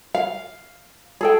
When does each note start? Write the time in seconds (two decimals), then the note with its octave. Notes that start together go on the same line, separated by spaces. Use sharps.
0.15 F5
1.21 G#4 A4 G5